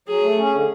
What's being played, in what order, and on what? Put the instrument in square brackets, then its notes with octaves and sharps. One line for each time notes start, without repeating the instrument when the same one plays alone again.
[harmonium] F#3 [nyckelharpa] G#4
[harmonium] A3
C#4
D3